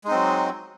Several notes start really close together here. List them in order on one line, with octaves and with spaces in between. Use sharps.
G#3 D#4 C4 F#3